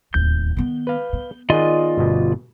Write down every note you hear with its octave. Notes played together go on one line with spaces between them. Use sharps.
D1 D#2 G6
D#3 B3
B4 F5
B3
D#3 F4 G#4 D5 D#5 F#5
G1 B2